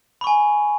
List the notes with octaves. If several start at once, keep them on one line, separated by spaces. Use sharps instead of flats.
G#5 B5 C#6